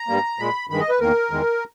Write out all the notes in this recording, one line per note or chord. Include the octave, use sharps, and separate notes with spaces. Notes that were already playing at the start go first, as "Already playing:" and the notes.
Already playing: A#5
G2 G3 A#3
A#2 G#3 B5
G2 D#3 G#3 B5
D#5
B4
E2 D#3 A#3 A#4
E2 D#3 G#3